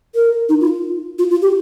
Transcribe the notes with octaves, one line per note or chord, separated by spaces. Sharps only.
A#4
D#4
F4
F4
F4
G4